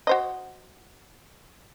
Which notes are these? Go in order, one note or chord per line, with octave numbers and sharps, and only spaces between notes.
F#4 C5 D#5